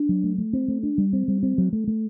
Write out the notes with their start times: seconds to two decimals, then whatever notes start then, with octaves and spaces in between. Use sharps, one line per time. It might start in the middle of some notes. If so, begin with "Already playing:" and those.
Already playing: D4
0.09 F#3
0.24 A3
0.38 A3
0.53 C4
0.68 A3
0.83 D4
0.98 G3
1.13 C4
1.28 G3
1.43 C4
1.58 F#3
1.73 A3
1.88 A3